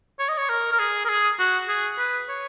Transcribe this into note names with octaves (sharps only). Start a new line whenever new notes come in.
C#5
D#5
C#5
A#4
A#4
G#4
A#4
G#4
F#4
G#4
B4
C#5